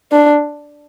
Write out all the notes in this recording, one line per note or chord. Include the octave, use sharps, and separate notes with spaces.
D4